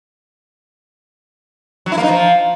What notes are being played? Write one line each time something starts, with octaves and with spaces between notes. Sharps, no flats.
F#3
E4
A#3
D#4
F3